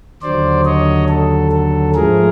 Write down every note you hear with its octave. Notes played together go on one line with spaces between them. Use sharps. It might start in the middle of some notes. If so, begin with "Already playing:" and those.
D#2 D3 F#3 C5 D5
C#5 D#5
A4
A4
G#2 F3 A3 G#4 A#4